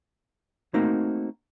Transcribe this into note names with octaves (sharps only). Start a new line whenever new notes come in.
A3 A#3 C4 D#4 F#4